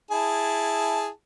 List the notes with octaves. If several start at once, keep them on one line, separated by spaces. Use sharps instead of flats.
E4 G#4 A5